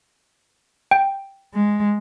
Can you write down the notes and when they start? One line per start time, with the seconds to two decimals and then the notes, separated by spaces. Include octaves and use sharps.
0.91 G5
1.54 G#3